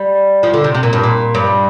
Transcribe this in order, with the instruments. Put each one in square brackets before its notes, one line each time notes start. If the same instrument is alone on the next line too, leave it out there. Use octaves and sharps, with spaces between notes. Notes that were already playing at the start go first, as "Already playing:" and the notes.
Already playing: [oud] G3
F3
D3
C3
C3
A#2
G2
A#2
G2